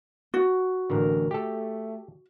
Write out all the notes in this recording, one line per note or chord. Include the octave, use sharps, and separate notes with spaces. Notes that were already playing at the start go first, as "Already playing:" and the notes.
F#4
A1 D3 A#4
A3 G4 A4